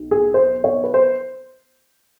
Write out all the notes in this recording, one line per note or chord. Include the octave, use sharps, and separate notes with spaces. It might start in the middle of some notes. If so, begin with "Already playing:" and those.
Already playing: B1
G#4
C5
C#5
B4
C5